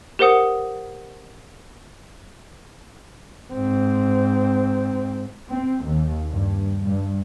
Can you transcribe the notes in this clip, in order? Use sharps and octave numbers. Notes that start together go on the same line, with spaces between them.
G4 A#4 C5 F#5 D#6 C#7
G#2 C4
C4
D#2
G2
G2